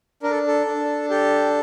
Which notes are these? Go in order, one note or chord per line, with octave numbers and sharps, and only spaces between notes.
D4 A#4
A4
A4
D4
G4 A4